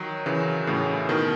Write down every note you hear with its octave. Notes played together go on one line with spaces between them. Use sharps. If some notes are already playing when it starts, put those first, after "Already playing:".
Already playing: D#3 F#3
C#3 E3
A2 C#3
B2 D#3